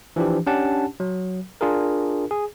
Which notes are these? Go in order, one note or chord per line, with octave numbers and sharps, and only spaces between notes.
E3 F3 D4 G4
C#4 D4 G4 F#5 A5
F#3
D4 F4 G#4 A#4
G#4